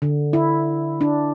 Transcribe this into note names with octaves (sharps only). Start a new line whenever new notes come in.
D3
E4
D4